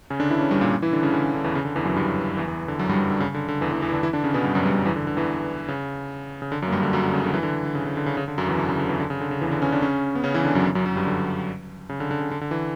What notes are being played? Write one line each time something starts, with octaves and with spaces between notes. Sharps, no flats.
C#3 C#4
D3 D4
E3 E4
C#3 C#4
G2 G3
A#2 A#3
E3 E4
D3 D4
C#3 C#4
D3
C#3
D3
E2 E3
C#3
D3
E2 E3
F#2 F#3
G2 G3
E2 E3
E2 E3
D3
F#2 F#3
G2 G3
F#2 F#3
D3
C#3
D3
D3
E2 E3
E2 E3
E2 E3
E4
D3 D4
E3 E4
D3 D4
C#3 C#4
B2 B3
G2 G3
F#2 F#3
G2 G3
F#2 F#3
E2 E3
D3
D3
E2 E3
C#3
C#3
D3
F#2 F#3
A#3
G2 G3
D3
F#2 F#3
D3
C#3
D3
E3
D3
D3
C#3
C#3
D3
C#3
C#3
D3
F#2 F#3
E2 E3
D3
C#3
D3
E2 E3
D3
C#3
D3
C#3
E2 E3
D3
C#3 C#4
D3 D4
C#3 C#4
B3
C#3 C#4
E3 E4
D3 D4
F#2 F#3
F#2 F#3
F#2 F#3
G2 G3
D3
C#3
D3
D3
C#3
D3
D3
E3